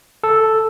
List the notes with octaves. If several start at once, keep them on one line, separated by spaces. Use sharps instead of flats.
A4